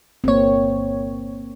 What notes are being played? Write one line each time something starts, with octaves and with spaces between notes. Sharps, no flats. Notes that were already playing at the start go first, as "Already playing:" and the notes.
G1 A#3 C4 C#5